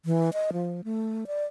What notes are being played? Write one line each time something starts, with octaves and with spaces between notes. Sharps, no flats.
E3
D#5
F3
A3
D5